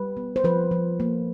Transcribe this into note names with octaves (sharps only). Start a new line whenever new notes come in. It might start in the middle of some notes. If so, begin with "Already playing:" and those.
Already playing: G3 B4
B3
C5
F3 B4
F3
A#3